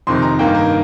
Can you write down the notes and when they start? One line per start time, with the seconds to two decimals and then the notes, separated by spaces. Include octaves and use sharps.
0.07 F2 C3 D#3 C6
0.22 A#5
0.39 G2 D#3 A#3 G5
0.55 A#4